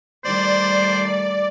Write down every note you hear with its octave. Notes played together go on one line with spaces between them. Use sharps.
D#3 G3 A3 C5 D5